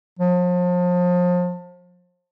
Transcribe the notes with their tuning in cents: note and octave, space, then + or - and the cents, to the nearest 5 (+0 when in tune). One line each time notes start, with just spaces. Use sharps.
F3 +35